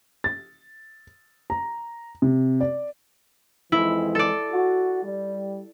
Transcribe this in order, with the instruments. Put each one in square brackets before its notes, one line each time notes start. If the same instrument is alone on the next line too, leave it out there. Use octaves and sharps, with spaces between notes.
[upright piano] A6
A#5
C3
D5
[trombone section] F2 E3 G#3 [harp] E4
[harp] A4 D5
[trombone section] F#4
G3